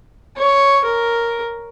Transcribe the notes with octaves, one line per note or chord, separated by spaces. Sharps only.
C#5
A#4